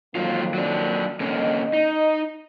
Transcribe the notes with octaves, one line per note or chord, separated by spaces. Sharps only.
F2 D#3 F#3 A#3 F4
F#3 D4
D3 A#3 C#4 D#5
D#4